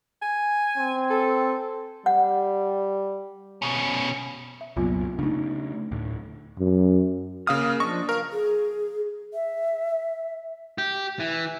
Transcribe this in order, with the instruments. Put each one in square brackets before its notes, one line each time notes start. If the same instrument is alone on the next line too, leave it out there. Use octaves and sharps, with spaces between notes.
[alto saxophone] G#5
[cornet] C4
[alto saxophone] A4
[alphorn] G3 [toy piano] F#5
[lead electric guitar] B2 C#4
[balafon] E5
[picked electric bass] C2 F#2 A#2 [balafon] F#3 B3 F4
[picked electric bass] C#3 A3 [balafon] D4 D#4
[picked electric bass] D2 A2
[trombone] F#2
[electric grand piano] C#3 F5 D#6 [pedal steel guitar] A#3 F6
[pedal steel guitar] F3 D4 D#5 [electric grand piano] C#6
[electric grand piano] A#4 [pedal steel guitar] F5
[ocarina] G#4
E5
[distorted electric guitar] G4
E3